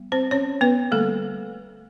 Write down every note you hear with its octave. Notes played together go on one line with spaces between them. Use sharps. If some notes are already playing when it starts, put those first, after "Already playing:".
Already playing: G3 B3
C4 C5
C#4 C#5
B3 B4
D3 G3 A3 A#3 A4